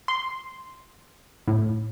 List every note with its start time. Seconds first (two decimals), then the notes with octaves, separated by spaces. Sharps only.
0.08 C6
1.48 A2